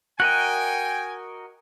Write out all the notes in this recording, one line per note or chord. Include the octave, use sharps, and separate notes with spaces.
F#4 A#4 D#5 G5 G#5 F#6